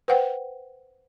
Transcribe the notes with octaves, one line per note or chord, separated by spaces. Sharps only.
B4 C5 F#5 G5